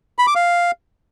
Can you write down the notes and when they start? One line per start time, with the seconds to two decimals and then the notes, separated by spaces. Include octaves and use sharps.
0.19 B5
0.27 D6
0.35 F5